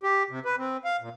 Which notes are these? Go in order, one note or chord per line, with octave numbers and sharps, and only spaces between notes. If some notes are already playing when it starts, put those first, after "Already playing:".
G4
C3
B4
C4
F5
A#2